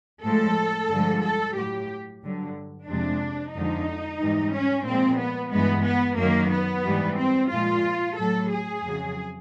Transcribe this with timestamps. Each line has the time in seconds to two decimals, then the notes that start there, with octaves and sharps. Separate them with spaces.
0.24 A2 F3 G#3 A4
0.90 G2 D3 F3 G#3
1.23 A4
1.56 A2 F#3 G4
2.23 G2 D3 F#3
2.88 F2 C3 F3 G#3 D4
3.54 F2 D3 F3 G#3 D#4
4.20 G#2 E3 G3
4.54 C#4
4.86 A#2 F3 G#3 C4
5.19 B3
5.52 G2 E3 G#3 B3
5.86 B3
6.19 F#2 D#3 F#3 A#3
6.52 B3
6.84 G#2 E3 G3
7.18 C4
7.51 A#2 F3 G#3 F4
8.17 A2 F#3 A4
8.51 G#4
8.83 F2 C#3 F#3